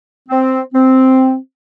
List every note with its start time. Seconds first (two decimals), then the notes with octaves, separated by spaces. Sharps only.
0.29 C4
0.73 C4